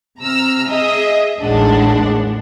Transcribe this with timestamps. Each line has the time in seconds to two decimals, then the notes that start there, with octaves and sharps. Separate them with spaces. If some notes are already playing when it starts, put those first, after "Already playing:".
0.20 C3 A#5 E6 F6
0.68 G#4 D#5 E5
1.40 A1 D#2 A2 G#3 D4 F#5